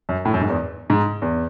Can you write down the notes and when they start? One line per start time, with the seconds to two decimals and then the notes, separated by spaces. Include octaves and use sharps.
0.09 F#2
0.25 A2
0.34 F#2
0.41 G#2
0.50 E2
0.90 G#2
1.22 E2